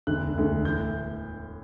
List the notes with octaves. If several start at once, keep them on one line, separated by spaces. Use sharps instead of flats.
E1 D2 D3 A3 F#6
E1 D2 D3 A3
A2 E3 G6